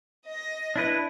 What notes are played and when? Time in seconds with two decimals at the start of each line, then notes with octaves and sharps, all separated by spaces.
0.26 D#5 A#6
0.76 D4 E4 B4